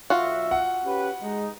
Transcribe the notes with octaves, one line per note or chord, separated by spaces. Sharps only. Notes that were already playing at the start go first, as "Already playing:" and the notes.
B1 F4 F#4 E5
F#5
C#4 G4 B4
G#3 D#4